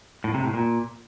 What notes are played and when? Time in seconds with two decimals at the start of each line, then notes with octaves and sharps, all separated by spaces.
0.24 A2
0.34 C3
0.44 A2
0.54 A#2